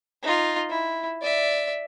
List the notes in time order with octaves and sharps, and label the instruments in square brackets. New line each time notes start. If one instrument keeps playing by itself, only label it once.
[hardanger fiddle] D#4 F4
E4
D5 E5